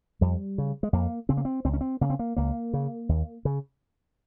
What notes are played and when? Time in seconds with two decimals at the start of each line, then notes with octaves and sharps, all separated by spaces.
0.21 F2 G3
0.58 C#3
0.83 G#3
0.93 F2 A#3
1.29 C#3 C4
1.37 A#3
1.45 C4
1.65 C#2 C4
1.73 C#4
1.81 C4
2.01 C#3 A#3
2.10 C4
2.19 A#3
2.36 C#2 A#3
2.73 C#3
3.09 D#2
3.45 C#3